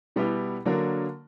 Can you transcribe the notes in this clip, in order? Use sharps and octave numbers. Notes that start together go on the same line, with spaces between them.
B2 G3 B3 E4 G4
D3 F#3 A#3 D4 A#4